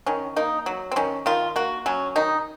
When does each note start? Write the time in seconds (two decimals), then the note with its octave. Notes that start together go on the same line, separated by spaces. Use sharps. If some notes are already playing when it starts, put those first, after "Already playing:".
0.06 D#3 C#4
0.36 A#3 D#4
0.66 F#3
0.91 C4
0.96 D#3 C#4
1.26 D#3 F4
1.56 A#3 F#4
1.86 F#3 C#4
2.16 D#3 D#4